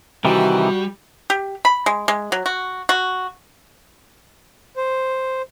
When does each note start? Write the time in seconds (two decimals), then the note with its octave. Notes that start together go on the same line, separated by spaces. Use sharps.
0.25 C3 D#3 E3 G3 F#4
1.30 G4
1.65 B5
1.86 G#3
2.08 G#3
2.32 F#3
2.46 F#4
2.89 F#4
4.76 C5